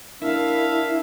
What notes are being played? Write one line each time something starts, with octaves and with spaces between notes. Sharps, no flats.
D4 E4 A#4 E5 F5